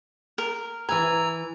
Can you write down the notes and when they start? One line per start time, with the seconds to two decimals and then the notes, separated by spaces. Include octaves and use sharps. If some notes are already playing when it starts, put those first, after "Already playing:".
0.38 A#4
0.89 E3 B4 G#5 A#5 E6